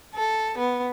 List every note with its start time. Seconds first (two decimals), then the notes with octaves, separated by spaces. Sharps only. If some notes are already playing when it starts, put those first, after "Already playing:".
0.14 A4
0.57 B3